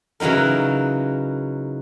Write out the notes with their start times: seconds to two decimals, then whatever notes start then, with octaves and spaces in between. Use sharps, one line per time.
0.20 C#3 E3 F#3 D#4 A#4